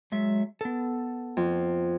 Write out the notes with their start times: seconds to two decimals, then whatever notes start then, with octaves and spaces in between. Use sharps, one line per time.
0.12 F#3 G#3 E5
0.61 B3 A4
1.37 F2